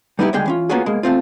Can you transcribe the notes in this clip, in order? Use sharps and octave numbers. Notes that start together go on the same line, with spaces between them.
G3 B3 D#4 E4 F#4 G4
C#2 D3 G3 G#3 G#4 G5
E3 C#4 F4
A#3 B3 C#4 F4 F#4 G#4
B2 G#3 A#3
E2 A3 C4 F4